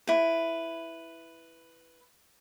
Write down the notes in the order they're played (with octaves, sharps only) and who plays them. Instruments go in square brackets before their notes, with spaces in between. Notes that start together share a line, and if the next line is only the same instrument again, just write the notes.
[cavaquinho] E4 B4